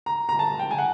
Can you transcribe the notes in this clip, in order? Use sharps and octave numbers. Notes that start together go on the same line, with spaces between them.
A#5
A#5
A5
G5
G#5
F#5